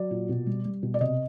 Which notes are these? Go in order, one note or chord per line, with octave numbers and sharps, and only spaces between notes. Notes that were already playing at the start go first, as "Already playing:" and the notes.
Already playing: F#3 D5
A#2
B2
G3
G3
B2
D5
C3 D#5